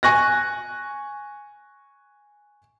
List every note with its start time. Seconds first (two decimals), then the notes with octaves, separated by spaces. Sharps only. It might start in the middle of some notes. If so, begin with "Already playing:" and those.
0.03 G#5 C#6 F#6 A#6